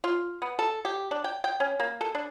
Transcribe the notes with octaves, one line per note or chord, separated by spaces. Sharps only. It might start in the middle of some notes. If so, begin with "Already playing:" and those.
F4
B3
A4
G4
D4
G5
G5
C#4
A#3
A4
D4